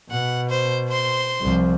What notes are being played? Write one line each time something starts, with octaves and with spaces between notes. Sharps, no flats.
B2 F#5
C5
C5 C6
C2 F3